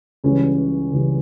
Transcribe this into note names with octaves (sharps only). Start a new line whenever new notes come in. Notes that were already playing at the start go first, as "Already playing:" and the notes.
C#2 C#3 E3 G3 C#4
C#2 C#3 E3 G3